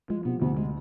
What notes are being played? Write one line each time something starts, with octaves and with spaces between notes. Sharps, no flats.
F3 G#3
C3 B3
D2 B3
G#3